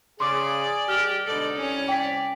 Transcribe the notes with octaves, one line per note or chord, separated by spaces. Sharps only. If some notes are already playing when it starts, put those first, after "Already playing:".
C#3 G#4 D5 C6 D6
D#3 G3 G4 F6
G#2 B2 D3 D#4 A4 D5
C2 C#4 C#5
D5 G5 B6